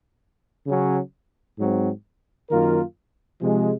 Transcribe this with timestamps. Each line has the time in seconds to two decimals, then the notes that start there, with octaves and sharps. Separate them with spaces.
0.67 C#3 F#3 C#4
1.59 G#2 F#3 C4
2.49 F#2 D#3 A#3 F4 A#4
3.41 C3 F3 G#3